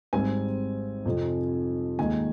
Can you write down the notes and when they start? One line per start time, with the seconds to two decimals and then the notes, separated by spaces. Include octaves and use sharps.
0.13 G#1 G#2 G3 C4 G#5
1.05 F2 C3 F3
1.99 D#2 D#3 G#3 G#5